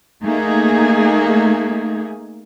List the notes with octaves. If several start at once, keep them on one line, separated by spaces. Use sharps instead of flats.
A3 A#3 D#4 G#4